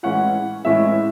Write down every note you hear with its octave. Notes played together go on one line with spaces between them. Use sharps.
A2 E3 G#3 C#4 E4 F#5
A2 E3 G#3 C#4 E4 E5